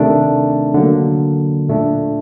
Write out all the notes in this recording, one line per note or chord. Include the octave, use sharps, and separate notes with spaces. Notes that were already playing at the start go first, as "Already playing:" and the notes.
Already playing: C3 D#3 A3 D4
D3 F#3 A#3
A#2 A3 D4